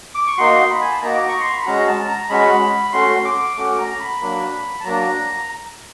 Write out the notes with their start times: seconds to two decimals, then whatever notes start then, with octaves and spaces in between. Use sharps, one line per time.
0.15 D6
0.27 C#6
0.38 A#3 D#4 F#4 C6
0.70 B5
0.81 G#5
0.92 A5
1.02 A#3 D#4 F#4 A#5
1.14 D6
1.28 C#6
1.40 C6
1.52 B5
1.66 G#3 C#4 F#4 A#5
1.87 A5
2.08 A#5
2.22 A#5
2.29 G#3 C#4 F#4 B5
2.93 A3 C#4 F#4 C6
3.25 D6
3.57 A3 C#4 F#4 D6
3.78 A#5
4.00 B5
4.21 F#3 A#3 D4
4.80 A5
4.84 F#3 A#3 D4 A#5